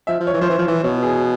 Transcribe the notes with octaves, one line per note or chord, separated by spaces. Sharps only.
F3 E5
F3
C#5
E3
F3 C5
E3 C#5
F3
E3
B2 C#5
G#4